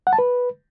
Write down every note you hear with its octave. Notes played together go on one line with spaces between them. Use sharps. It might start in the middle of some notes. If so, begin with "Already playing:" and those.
F#5
A5
B4